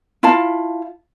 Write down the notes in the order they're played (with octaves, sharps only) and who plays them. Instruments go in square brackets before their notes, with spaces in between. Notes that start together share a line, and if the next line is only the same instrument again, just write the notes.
[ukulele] E4 F4 F5 A5